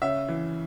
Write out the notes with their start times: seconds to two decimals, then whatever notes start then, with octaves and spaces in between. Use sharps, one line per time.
0.02 C#3 E5
0.28 E3